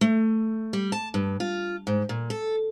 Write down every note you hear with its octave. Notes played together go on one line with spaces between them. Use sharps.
A3
G3
A5
G2
F4
G#2
A#2
A4